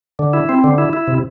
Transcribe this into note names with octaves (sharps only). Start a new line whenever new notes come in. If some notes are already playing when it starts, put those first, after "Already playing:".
D3
E4
C4
D3
E4
E4
C3